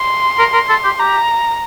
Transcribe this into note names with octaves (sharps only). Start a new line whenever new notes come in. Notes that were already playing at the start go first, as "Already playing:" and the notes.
Already playing: C6
A#4
A#4
A4
G4
G4 A#5